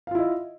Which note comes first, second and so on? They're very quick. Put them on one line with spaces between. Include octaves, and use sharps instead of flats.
F5 F4 E4 D#5